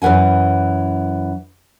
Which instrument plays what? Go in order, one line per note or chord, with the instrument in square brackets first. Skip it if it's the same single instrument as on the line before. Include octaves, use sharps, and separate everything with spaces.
[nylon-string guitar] F#2 E3 B4 F#5 G#5